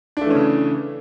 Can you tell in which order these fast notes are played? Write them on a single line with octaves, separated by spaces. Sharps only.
D4 A3 E3 C#4 C#3